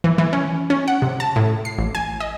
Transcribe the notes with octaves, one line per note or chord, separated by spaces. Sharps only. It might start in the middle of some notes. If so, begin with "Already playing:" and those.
E3
E3
C#4
C#4
F#5
C3
A5
A2
C7
A1
G#5
D#5